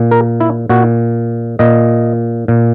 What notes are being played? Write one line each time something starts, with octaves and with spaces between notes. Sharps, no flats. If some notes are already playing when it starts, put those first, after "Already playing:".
Already playing: A#2
A#4
E4
A#2 F#4
A#2 D#5
A#2